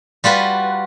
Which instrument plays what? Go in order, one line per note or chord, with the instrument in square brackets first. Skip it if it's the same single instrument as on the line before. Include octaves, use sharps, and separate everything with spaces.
[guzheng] G3 F4 F#4 B4